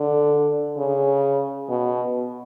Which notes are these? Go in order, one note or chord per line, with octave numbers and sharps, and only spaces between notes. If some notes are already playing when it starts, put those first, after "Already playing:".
Already playing: D3
C#3
B2